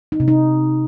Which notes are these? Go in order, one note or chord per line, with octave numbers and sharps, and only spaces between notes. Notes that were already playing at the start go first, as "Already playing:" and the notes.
D#4
C3
D#4